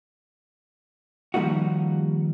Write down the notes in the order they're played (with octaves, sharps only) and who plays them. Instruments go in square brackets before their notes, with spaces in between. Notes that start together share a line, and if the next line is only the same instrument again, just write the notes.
[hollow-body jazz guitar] D#3 F3 G3 A#3 D#4 F#4